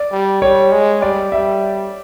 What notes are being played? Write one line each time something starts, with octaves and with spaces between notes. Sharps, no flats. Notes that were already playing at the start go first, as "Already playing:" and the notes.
Already playing: D5
G3
G3 C#5
G#3
G3 D5
G3 E5